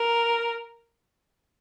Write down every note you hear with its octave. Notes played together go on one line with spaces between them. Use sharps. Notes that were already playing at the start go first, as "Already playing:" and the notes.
Already playing: A#4